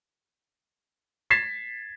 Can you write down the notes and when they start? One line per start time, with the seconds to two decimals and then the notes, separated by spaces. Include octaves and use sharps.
1.30 G#6 A6 B6 C7 E7